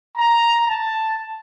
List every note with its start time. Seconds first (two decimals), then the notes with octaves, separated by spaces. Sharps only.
0.18 A#5
0.69 A5